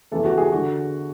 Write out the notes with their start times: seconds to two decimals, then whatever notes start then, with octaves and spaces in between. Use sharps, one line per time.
0.12 E2 C#3 E3 A4
0.25 F#4
0.38 G#4
0.52 D3 F#4